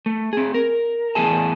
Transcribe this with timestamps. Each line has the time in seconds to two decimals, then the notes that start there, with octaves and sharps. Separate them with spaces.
0.06 A3
0.33 C4 G#4
0.54 A#4
1.15 E2 A2 G#4 A5